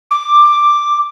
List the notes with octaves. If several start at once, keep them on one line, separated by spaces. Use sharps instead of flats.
D6